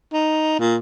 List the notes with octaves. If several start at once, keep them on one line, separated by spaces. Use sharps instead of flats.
D#4
A#2